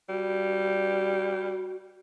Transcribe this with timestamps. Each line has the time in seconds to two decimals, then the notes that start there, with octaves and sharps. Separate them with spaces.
0.09 G3 F#4